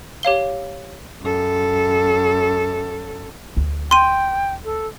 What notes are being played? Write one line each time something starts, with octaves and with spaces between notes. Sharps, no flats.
G4 C#5 F5 G7
F#2 A4
D2
G5 C6 D#7
A4